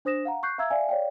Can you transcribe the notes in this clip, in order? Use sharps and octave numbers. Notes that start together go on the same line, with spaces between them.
D4 C5 D#6 A#6 E7
F5 F#5 A#5
C#6 F#6 G6 C7
E5 F5 A#5 E6 G#6
D5 E5 F5 G#5
C#5 D5 F5 G5